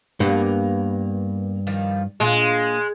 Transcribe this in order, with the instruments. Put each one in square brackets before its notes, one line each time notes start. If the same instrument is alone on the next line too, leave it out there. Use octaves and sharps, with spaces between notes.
[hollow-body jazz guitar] G2 [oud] A#3 B3 D4
[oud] D#3 F3 G3
[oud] A#2 D4 F4 [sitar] G#3